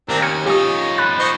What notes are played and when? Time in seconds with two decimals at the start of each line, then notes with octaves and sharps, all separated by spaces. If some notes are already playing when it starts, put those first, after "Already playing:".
0.09 D#2 C4 D4 A#4
0.22 C#4 F6 G#6 C#7
0.46 F3 C#4 D#4 F4 G4 C#5 D#6
0.98 B5 F#6 A6
1.19 C5 D#5 C#6